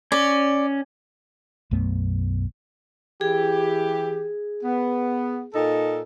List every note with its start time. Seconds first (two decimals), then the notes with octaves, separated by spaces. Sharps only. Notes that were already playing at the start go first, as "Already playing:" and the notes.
0.12 C#4 D5
1.71 B1 F#2 A3 B3
3.21 E3 G4 G#4
4.64 B3
5.54 A#2 D#4 A4